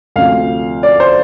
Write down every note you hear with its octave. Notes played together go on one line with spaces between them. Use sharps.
D2 C3 F3 F5
D5
C5